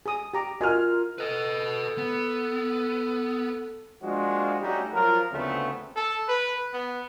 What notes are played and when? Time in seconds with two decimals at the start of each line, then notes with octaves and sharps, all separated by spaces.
0.06 G#4 D#6
0.34 G4 A#5 D6
0.61 F4 F#4 A#4 D#5 G#5 F6
1.18 A4 B4 D#5
1.98 B3
4.03 F3 G#3 A#3 D4 F4 F#4
4.61 G3 A3 C#4 D#4 F#4 G4
4.93 F3 F#3 F4 A#4
5.32 D2 C#3 F3 A3 B3 C4
5.96 A4
6.28 B4
6.73 B3